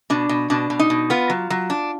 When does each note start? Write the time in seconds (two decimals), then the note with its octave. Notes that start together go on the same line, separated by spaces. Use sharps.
0.10 B2 D4
0.29 B2
0.50 B2 D4
0.70 B2
0.79 D#4
0.90 B2
1.10 B3 F4
1.30 F#3
1.50 F#3
1.70 D4